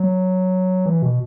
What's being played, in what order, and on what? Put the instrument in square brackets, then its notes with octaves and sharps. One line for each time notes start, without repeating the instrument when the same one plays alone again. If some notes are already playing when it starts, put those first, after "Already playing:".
Already playing: [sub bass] F#3
E3
B2